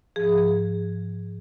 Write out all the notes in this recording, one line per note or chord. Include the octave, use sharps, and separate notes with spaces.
G#2 F3 G#4